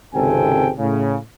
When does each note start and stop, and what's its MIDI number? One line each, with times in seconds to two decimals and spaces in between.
0.14 0.71 32
0.14 0.71 37
0.14 0.71 48
0.14 0.71 69
0.14 0.71 79
0.14 0.71 80
0.78 1.16 45
0.78 1.16 49